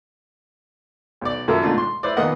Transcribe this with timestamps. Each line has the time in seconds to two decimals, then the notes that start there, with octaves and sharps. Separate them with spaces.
1.21 B1 D5
1.48 F#2 A#2 A4 A#4 E5
1.62 G#2 B2 A3 D4 F4
1.78 C6
2.03 E4 B4 C5 D5
2.17 A#1 D#3 A#3 B3 D#5 F#5